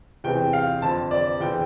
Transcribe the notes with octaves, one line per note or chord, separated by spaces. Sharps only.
E2 C3 E3 G5
F5
F2 D3 A5
D5
E2 D3 G5